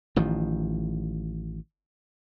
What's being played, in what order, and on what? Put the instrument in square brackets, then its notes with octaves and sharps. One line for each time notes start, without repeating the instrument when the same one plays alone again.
[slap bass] A1 D#3 F3